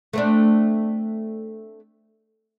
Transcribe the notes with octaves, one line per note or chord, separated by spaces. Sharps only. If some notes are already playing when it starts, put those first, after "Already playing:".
A3 C4 D4